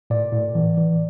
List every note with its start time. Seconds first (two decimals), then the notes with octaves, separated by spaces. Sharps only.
0.10 A2 D5
0.32 A2
0.55 E3
0.77 E3